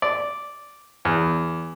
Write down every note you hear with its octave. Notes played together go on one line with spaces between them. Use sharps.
D5
E2